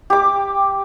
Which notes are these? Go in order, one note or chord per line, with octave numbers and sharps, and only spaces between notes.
G4 D6